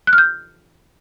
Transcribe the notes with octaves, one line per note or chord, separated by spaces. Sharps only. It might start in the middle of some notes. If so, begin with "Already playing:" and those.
F#6
F6
G6